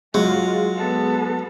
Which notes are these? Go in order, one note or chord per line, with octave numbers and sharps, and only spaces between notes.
F#3 G#3 F4
B3 A4